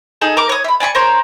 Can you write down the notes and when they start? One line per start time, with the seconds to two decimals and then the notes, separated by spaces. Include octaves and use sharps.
0.21 D#4 G#4 A4
0.37 A#4 D6
0.49 C#5 D#6
0.64 E5 B5
0.80 D5 G#5 B5 C#6
0.95 A#4 C5 C#5